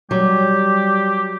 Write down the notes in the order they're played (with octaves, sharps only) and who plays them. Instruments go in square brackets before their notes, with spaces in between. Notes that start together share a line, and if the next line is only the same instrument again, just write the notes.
[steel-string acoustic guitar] F#3 [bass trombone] G3 [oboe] G4